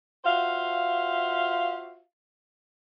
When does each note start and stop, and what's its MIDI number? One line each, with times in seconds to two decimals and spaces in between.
0.25 1.99 65
0.25 1.99 66
0.25 1.99 72
0.25 1.99 76
0.25 1.99 77